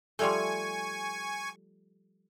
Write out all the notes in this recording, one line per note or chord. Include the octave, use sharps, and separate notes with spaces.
F3 G3 A3 G#5 C#6